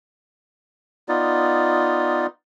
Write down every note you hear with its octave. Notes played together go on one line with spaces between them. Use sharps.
B3 D#4 F4 D5